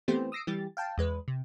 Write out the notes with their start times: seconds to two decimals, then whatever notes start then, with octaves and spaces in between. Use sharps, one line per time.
0.08 E3 A3 B3 C4 G4 C5
0.32 D#6 E6 A#6 C7 D7
0.47 E3 G3 G4 A6
0.77 F5 G5 A5
0.98 E2 G#3 B4
1.28 C3